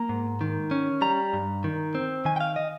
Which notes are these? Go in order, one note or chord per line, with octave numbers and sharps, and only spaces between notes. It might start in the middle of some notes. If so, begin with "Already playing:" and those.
Already playing: A#3 A#5
G#2
D#3
C#4
G3 A#5
G2
D#3
C4
D#3 G#5
G5
F5
D#5